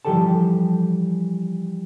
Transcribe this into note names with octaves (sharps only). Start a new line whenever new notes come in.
E3 F3 G3 G4 A4 A5